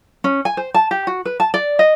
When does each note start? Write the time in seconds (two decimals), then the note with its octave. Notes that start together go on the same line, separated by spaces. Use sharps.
0.24 C#4
0.45 G#5
0.57 C5
0.74 A5
0.91 G4
1.07 F#4
1.25 B4
1.40 A5
1.54 D5
1.79 D#5